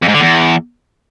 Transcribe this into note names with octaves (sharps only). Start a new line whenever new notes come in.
F2
G#2
D3
E2